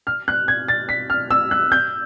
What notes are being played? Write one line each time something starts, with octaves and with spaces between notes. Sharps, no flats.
F6
F#6
G#6
A6
B6
F6
E6
F#6
G6